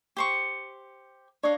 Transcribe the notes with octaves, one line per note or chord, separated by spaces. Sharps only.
G4 C5 C#6
D4 C#5 D#5 F5